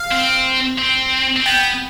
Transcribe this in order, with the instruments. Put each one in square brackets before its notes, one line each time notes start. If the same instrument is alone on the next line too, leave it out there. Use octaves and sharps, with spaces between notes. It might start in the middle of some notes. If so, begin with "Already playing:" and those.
Already playing: [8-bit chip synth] F5
[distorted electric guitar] C4
C4
C4
[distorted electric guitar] B3 [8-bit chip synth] G5